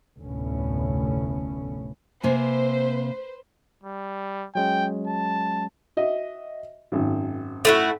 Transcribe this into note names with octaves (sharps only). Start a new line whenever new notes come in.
F1 D2 A2 B3 C#4
C3 A#3 B4 C5 G#5
G3
F#3 G#3 C#4 G5
A5
F#4 D#5 E5
G#1 F#2
A3 E4 F#4